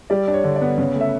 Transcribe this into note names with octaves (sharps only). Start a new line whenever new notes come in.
G3 D5
D4
C#5
D3
D5
B3
C#3
A3
E5